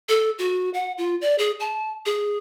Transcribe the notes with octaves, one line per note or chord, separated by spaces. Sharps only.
A4
F#4
F#5
F4
D5
G#4
A5
G#4